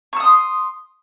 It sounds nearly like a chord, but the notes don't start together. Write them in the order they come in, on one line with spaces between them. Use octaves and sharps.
C#6 E6 D#6 C6